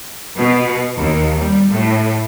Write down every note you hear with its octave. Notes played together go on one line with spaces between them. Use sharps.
B2
D#2
G3
A2